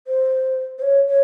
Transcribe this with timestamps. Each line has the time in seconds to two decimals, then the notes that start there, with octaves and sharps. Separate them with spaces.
0.07 C5
0.79 C5
0.82 C#5
1.08 C#5